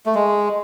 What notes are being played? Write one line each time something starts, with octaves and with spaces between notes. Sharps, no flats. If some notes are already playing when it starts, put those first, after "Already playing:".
A3
G#3